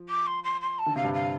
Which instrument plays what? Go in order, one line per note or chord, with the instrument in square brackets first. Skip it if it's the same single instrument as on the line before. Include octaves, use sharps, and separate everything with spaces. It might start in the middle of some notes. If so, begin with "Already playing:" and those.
Already playing: [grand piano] F3
[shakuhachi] D6
C6
C6
C6
A5
[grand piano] D3
[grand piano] C3 [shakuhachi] F5
[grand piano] G2
[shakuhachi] F5